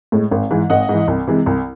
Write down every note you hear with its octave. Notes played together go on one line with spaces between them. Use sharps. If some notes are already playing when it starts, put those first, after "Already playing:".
A2 G#3
G#1
G#2 E3
G#1 D#5 F#5
G#2 E3
C2
C3 E3 G#3
C2